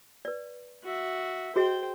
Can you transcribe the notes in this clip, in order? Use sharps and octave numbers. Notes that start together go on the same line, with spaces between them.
B4 D5
F#4 E5
F#4 G#4 C5 D#5 G5